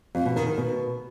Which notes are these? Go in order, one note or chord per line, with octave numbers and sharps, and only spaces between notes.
F2
B2
D#3
D#3
B2